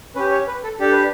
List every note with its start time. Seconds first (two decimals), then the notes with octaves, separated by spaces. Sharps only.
0.16 C#4 G4 B4
0.31 C#5
0.47 B4
0.64 A4
0.80 D4 G4 A4
0.92 B4